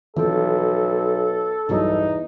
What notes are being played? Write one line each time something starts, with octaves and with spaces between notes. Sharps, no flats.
B1 E3 F3 C4 A4
B1 E2 G2 F#3 D#4